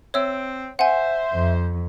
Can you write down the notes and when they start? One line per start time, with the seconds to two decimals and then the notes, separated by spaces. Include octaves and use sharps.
0.14 C4 C#5 E5 E6
0.79 C5 E5 F#5 G#5
1.33 F2